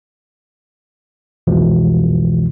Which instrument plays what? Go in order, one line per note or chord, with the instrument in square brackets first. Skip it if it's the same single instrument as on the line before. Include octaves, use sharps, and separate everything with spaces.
[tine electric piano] C2 F2 B2 E3 F3 G#3